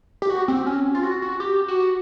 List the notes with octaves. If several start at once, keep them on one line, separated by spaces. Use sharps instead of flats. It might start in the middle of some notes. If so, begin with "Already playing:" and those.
G4
F#4
C4
C#4
F4
F#4
F#4
G4
F#4